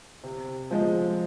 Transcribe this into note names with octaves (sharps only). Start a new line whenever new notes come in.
C3
F3 G#3